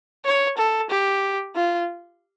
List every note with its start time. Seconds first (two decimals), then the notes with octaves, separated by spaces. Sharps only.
0.25 C#5
0.58 A4
0.90 G4
1.55 F4